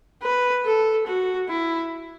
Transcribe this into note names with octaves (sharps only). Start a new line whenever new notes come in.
B4
A4
F#4
E4